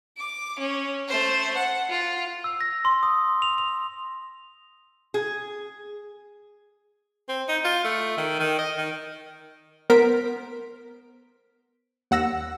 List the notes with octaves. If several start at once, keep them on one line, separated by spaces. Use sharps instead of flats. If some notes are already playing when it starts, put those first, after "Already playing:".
D6
C#4
A3 C5
F#5
F4
E6
A#6
C6
D#6
F7
F7
G#4
C4
D#4
F4
A3
D#3
D#3
D#5
D#3
B3 A#4 C5 B6 D7
D#2 F#5 E6 A#6